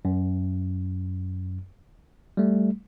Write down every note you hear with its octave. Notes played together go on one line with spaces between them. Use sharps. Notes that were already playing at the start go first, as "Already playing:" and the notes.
F#2
G3 A3